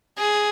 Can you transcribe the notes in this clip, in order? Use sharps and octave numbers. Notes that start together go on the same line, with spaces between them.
G#4